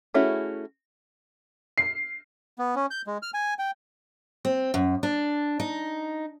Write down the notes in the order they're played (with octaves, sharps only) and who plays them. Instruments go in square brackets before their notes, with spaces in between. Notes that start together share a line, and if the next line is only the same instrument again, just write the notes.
[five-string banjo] A3 C#4 E4 F#4 G#4
[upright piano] C7
[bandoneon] B3
C#4
G6
G#3
F6
G#5
G5
[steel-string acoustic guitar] C4
F#2
D4
D#4